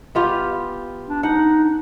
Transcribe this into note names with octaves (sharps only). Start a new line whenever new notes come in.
B3 F4 G4
D4
D#4 F#5
D4